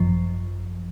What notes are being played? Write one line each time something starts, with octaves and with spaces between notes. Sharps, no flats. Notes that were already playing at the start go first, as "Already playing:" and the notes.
Already playing: G#1 F#2 F3